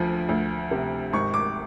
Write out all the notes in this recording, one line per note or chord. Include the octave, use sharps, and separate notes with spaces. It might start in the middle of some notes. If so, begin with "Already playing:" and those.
Already playing: D2 F3
D2
C3
G#1 C#6
D6